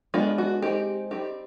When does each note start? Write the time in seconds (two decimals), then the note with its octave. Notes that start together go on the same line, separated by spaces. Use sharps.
0.14 G#3 B3 D4 F4
0.38 F#4
0.62 G#3 C4 D#4 G4
1.11 G3 C4 D#4 G4